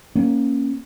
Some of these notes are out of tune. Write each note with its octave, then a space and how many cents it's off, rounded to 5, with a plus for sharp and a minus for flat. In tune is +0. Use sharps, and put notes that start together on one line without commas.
A#3 +0 C#4 -10